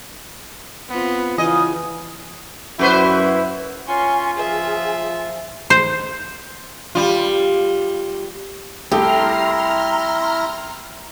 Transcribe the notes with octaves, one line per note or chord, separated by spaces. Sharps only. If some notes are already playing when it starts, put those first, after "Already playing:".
B3 C4 F4 B4
C#3 E3 F4 D#5 G#5
F#2 E4 F#4 B4 C5
C#4 F4 G#5 C6 C#6
F3 G#4 E5
C5
G3 F4
C2 A3 E4 G4 A#5 C6 F6